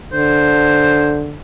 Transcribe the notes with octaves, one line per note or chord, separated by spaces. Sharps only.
D3 C5